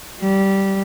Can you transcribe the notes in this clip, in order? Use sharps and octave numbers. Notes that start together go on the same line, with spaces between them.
G3